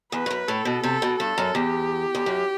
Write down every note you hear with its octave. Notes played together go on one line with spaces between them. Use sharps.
E2 B4
G2
F#2
A2 A4
B2
C3 A4
B2
G2 A4
F#2
E2 G4
E2
F#2